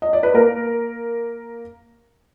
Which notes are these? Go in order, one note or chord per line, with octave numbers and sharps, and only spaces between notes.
D#5
D5
B4
A#3 A#4